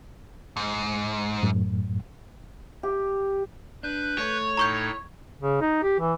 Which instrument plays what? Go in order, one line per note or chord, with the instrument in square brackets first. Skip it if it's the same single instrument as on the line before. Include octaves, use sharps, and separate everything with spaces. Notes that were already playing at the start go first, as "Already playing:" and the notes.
[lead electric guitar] G#2
[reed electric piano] F#2 A2
[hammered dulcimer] G4
[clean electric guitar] D4 [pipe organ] B4 F#6 G6
[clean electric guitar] A3 [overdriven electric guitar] C#5
[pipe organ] A2 D#4 [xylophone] A#5 C#6 G6
[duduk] C#3
D#4
G4
E3